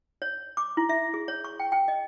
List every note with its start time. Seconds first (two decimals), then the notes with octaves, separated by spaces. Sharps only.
0.22 C#5
0.57 D6
0.77 E4
0.89 E5
1.14 G#4
1.28 C#5
1.44 C#6
1.60 G5
1.72 G5
1.88 D#5